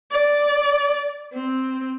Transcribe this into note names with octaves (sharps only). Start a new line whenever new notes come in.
D5
C4